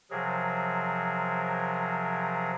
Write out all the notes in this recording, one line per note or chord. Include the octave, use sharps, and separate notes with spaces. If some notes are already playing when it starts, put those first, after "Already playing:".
C3 F3 F#3 G#4 A#4